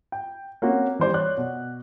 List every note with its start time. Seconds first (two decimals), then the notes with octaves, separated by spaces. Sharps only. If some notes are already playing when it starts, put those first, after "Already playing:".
0.12 G5
0.62 A#3 C4 C#4 F#4
0.99 E3 G3 C5 D5
1.14 C#5 D5 F#6
1.38 B2